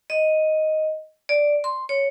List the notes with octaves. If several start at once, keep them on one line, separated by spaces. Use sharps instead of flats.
D#5
D5
C6
C#5